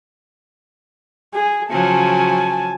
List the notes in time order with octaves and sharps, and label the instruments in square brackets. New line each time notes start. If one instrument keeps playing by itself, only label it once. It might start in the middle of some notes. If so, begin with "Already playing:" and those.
[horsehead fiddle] G#4
[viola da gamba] C#3 F3 F#3 [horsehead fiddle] G#5 A5